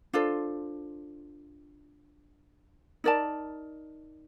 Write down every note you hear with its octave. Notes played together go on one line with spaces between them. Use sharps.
D4 F4 A4 C5
D#4 A#4 D5 A5